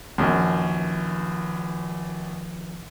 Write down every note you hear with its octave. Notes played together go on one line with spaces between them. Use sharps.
A#1 F#2 D#3 F3